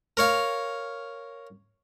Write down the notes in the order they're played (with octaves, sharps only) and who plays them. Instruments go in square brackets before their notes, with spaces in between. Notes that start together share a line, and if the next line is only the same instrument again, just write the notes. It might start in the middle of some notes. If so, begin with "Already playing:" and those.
[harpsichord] A#4 C#5 F5